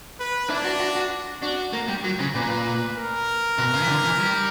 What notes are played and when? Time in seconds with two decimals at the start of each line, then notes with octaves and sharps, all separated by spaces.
0.19 B4
0.50 D4 E4
0.65 F#4
0.80 F#4
0.96 F#4
1.42 D4 F#4
1.73 A#3
1.88 G3
2.04 F#3
2.19 C#3
2.35 A#2 B4
2.97 A#4
3.58 B2
3.74 C#3
3.82 E3
3.89 D3
4.04 E3
4.20 G3